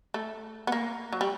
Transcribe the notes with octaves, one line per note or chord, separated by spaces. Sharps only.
A3
B3
A#3
F#3
G3